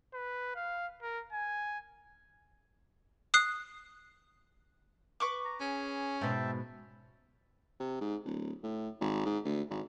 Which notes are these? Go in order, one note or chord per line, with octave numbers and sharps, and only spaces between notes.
B4
F5
A#4
G#5
D#6 F#6 C7
B4 C#6 D6
A#5
C#4 G#4
G#2 B2 E5 G5 A5
C3
G#2
D1
A2
G#1
G#2
D2
G#1